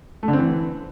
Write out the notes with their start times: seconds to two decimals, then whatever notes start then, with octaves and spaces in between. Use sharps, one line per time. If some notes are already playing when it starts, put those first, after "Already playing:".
0.23 A3
0.28 D3
0.33 C4
0.39 E3